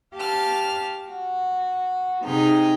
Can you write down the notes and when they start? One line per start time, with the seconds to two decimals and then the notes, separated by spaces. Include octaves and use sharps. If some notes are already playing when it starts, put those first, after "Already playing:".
0.15 G4 F5 A5 F6
1.08 F#4
2.24 C3 D#4 G#4 G5 F6